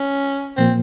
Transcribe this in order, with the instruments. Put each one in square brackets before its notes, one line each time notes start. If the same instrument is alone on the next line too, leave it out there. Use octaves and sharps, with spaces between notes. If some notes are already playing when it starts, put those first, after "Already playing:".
Already playing: [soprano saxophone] C#4
[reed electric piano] A#2 F3 A#3 [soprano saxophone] C4